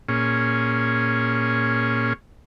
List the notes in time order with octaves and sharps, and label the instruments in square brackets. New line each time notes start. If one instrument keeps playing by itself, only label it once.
[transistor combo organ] A#2 C#4 G#4